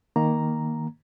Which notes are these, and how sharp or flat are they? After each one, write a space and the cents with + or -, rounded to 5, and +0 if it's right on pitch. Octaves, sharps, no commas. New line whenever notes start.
D#3 +0 A#3 +0 A#5 +0